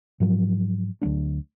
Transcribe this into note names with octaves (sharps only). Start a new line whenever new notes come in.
G#2 F3 F#3
D2 F#3 B3 D4